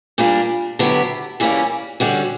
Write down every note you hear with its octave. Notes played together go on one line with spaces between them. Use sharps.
A#2 G3 A#3 D4
D3 F#3 B3 E4 G4
E3 G3 A#3 C#4
D3 G3 C#4 F#4